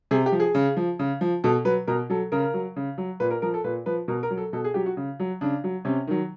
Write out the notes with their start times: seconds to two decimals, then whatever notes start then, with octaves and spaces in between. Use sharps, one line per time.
0.11 C3 G#4
0.26 G4
0.32 F3
0.40 G#4
0.55 C#3
0.77 F3
0.99 C#3
1.21 F3
1.44 B2 A4
1.65 F#3 B4
1.87 B2 A#4
2.10 F#3 A4
2.32 C#3 A#4
2.54 F#3
2.76 C#3
2.98 F#3
3.20 A#2 B4
3.31 A#4
3.42 F3 A#4
3.54 A4
3.64 A#2 B4
3.86 F3 B4
4.08 B2 A#4
4.23 A#4
4.30 F#3
4.37 A4
4.53 B2 A4
4.64 G#4
4.74 F#3 G4
4.86 F#4
4.97 C#3
5.20 F#3
5.41 C#3 D4
5.64 F#3
5.85 C3 C#4
6.07 D#3 F#3